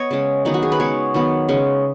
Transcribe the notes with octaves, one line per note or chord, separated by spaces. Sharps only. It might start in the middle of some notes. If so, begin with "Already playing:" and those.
Already playing: B3 C#5 D#5
C#3 G#3 C#4
D#3 F#3 B3 D#4
F#4
G#4
B4
C#3 G#3 B3 C#5
D#3 F#3 B3
C#3 G#3 C#4